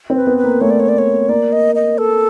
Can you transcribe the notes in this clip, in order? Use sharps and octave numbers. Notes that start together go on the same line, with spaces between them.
C4
B4
B3
B4
A#3
A3 C#5
D5
C#5
D5
C#5
A#3 D5
D#5
D#5
A4